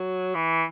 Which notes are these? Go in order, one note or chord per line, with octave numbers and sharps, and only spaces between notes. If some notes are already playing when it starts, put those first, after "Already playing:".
Already playing: F#3
E3